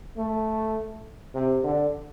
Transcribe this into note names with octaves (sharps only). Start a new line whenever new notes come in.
A3
C3
D3